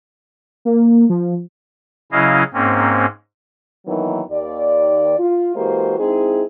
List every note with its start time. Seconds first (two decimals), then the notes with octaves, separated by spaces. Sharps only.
0.65 A#3
1.10 F3
2.12 C#3 F#3 C#4 E4 D#5 F5
2.53 G#2 A#3 C4 C#4
3.86 D#3 E3 F#3 A#3 B3 D#4
4.30 D#2 D5
5.18 F4
5.55 E3 G#3 A#3 F#4 G4 C5
5.99 G#3 C4 D#4 E4 G#4